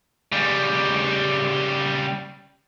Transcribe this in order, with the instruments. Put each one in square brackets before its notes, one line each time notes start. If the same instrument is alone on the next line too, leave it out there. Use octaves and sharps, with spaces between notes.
[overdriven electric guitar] C#3 G3